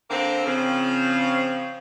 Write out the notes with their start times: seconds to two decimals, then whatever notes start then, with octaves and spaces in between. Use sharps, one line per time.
0.10 D3 A#3 C4
0.46 C#3 F3 C4